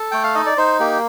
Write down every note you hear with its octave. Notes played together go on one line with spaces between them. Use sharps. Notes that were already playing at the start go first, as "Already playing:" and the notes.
Already playing: A4
A3 G5
F5
D#4 D#5
D5
D#4 C5
A#3 G4